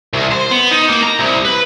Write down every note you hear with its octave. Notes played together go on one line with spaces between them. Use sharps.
C2
C5
B3
D#4
A#3
A#5
C2
B4